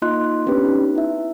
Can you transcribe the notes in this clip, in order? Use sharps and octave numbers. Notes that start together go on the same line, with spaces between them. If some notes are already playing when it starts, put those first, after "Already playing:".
A#3 D#4 F4 D#5 C6 F#6
B3 C#4 D4 G4 B4
D#4
E4 E5